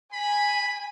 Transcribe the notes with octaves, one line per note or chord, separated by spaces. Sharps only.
G#5 B5